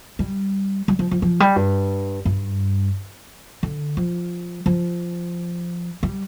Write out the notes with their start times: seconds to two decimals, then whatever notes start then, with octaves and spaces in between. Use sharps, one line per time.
0.19 G3
0.88 G3
0.99 F3
1.11 F3
1.22 F3
1.40 G3
1.56 G2
2.25 G2
3.63 D3
3.97 F3
4.66 F3
6.03 G3